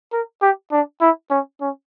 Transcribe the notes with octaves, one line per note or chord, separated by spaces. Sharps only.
A#4
G4
D4
E4
C#4
C#4